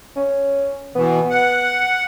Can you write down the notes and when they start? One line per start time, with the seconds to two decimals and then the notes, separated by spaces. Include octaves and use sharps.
0.16 C#4
0.96 B2 E3 B3
1.30 F#5